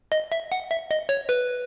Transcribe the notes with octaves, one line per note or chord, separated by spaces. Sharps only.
D#5
E5
F#5
E5
D#5
C#5
B4